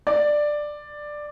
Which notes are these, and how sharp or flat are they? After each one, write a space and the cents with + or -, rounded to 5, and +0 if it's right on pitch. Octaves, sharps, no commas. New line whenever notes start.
D5 +10